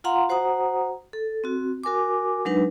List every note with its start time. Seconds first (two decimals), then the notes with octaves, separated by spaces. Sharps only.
0.04 F4 F5 F#5 A#5 C6
0.29 F#4 C5 F#5 A#5 D#6
1.13 A4
1.44 C4 F#4
1.84 F#4 A#4 G#5 D6
2.45 F#3 G#3 D4 D#4 B4